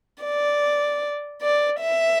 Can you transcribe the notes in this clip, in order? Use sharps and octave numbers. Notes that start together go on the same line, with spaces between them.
D5
D5
E5